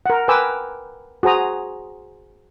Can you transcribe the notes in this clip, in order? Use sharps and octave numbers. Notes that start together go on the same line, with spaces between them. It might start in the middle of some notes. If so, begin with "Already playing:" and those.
A#4 F#5
A#4 B4 G5 G#5 D6 E6
F#4 G#4 C5 A#5 D#6